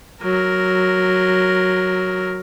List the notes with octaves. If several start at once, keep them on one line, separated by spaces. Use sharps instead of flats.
F#3 A#4